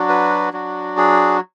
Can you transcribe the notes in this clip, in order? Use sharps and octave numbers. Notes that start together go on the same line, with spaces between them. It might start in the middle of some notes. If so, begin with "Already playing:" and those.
Already playing: F#3 D4 F#4
B4
F#3 D4 F#4
G#4